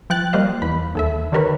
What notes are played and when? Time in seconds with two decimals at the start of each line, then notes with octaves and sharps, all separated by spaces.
0.10 F3 G5 F#6 A6
0.33 G3 A#3 C5 D#5 F5
0.62 E2 B5
0.95 D#2 A4 E5
1.32 D3 D#3 G4 A#4 B4 C#5